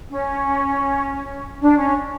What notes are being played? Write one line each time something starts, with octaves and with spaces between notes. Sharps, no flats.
C#4
D4
C#4